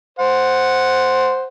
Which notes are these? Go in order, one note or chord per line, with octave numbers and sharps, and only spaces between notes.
C5 F#5